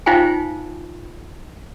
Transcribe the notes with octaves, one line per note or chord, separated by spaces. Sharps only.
D#4 F4 C5 F5 G5 G#5